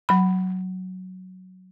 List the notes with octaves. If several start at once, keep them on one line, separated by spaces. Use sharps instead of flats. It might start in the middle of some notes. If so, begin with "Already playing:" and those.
F#3 B5